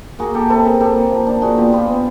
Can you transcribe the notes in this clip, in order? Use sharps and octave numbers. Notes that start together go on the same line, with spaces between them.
A#3 F#4 G#4
A#3 G4 A4
C3 A4 B4
C3 G#4 A#4
A#3 G4 A4
A#3
F3
D4
A#2 F#4 G#4
B3 F4 G4
B3 F4 G4
B3